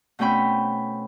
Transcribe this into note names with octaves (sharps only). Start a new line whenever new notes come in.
B2 A3 C4 C#4 G5 B5